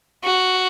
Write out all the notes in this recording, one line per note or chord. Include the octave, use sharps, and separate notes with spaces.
F#4